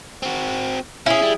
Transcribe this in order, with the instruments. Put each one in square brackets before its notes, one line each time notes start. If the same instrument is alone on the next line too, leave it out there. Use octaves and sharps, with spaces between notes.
[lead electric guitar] C4 F#4
[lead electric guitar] C#4 [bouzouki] E4 G#4
[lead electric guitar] G3